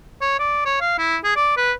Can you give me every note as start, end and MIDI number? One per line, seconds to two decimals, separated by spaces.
0.21 0.38 73
0.39 0.65 74
0.66 0.76 73
0.81 0.94 77
0.98 1.17 64
1.24 1.32 68
1.36 1.52 74
1.57 1.73 71